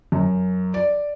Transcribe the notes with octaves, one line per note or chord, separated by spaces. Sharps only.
F#2
D5